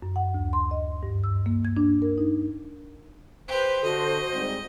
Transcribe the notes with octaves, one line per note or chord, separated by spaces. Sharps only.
F#2
F#5
D2
C6
D#5
G2
E6
A#3
G#6
D4
A#4
D#4
G4 B4 C5
D3 F#4 A4 D#5
G#2 G3 C4